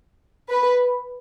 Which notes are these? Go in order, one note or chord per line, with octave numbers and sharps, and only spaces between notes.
B4